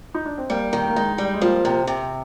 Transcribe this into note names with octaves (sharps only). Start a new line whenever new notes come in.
D#4
D4
C4
G3 A#3
D#3
A#3
G#3 D#4
G3
G#3
F3 A#3
C3 A#3
C4
C3